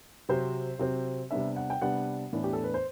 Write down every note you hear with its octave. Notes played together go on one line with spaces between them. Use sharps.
C3 F#3 C4 C5
C3 F#3 C4
C3 G3 B3 D4 E5
F#5
G5
C3 G3 B3 D4 F#5
A2 E3 B3 D4
G4
A4
B4
C5